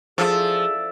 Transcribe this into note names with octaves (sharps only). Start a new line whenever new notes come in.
F3 G#4 A4 D5 E5